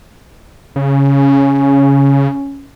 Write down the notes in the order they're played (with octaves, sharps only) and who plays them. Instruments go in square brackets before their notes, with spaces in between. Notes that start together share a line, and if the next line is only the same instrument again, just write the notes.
[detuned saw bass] C#3 [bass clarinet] C#4